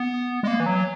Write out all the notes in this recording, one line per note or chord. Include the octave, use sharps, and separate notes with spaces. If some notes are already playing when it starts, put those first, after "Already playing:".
Already playing: B3
G#3
A#3
E3
F#3